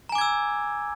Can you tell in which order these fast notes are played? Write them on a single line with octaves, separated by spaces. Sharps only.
A#5 G#5 D6 G#6 E6